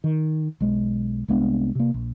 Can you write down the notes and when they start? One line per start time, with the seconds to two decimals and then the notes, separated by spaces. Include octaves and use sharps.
0.04 D#3
0.60 B1 G#3
1.28 C2 G#3 B3 D4
1.75 C3 A#3
1.94 A#1